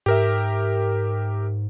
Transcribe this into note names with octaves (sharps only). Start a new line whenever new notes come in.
G#2 G4 A#4 E5